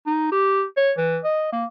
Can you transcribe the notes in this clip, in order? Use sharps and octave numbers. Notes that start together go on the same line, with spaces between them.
D#4
G4
C#5
E3
D#5
A#3